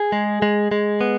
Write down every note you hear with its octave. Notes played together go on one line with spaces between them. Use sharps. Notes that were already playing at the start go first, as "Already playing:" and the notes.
Already playing: G#4
G#3
G#3
G#3
B3